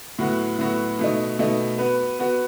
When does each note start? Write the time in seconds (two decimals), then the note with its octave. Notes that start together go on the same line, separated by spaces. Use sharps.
0.19 A2 F#3 B3 F#4
0.59 A2 F#3 B3 F#4
0.99 B2 A3 D#4
1.39 B2 A3 D#4
1.78 B3 F#4 B4
2.19 B3 F#4 B4